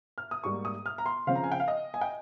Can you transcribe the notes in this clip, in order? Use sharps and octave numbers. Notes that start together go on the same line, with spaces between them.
F6
D#6
G#2 G3 A#3 C#6
D#6
F6
A#5
C6
C#3 F3 C4 F5
A#5
G#5
G5
F5
D#5
G#5
G5